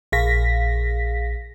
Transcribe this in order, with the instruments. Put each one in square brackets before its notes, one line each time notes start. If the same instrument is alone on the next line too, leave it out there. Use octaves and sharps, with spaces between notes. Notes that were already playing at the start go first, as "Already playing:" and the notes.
[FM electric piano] A#1 G#4 F5 A#6 B6